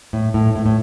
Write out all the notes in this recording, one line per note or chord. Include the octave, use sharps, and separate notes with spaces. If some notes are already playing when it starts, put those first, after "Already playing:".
A2
A2
A2
A2